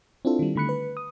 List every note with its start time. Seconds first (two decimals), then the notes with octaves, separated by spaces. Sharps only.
0.25 C4 D4 E4 F4 A4
0.39 D#3 G3
0.56 D3 A3 B5 F#6 C#7
0.69 B4
0.97 D#6